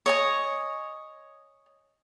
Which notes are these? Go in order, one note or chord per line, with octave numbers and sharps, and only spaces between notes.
C#5 D#5 G#5